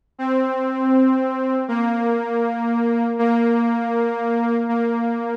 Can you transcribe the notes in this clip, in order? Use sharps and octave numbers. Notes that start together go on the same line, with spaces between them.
C4
A#3
A#3
A#3